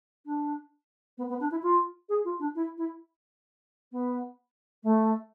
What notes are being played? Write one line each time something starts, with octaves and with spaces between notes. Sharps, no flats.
D4
B3
B3
D4
E4
F4
G#4
F4
D4
E4
E4
B3
A3